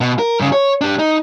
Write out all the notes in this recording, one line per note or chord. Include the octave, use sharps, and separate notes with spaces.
B2
A#4
G2 C#3
C#5
D4 G4
D#4